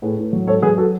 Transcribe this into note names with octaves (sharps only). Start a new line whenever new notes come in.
A2 G#4 B4
A2
F#3
G#2 A4 C#5
F#3 G#4 B4
F#4 A4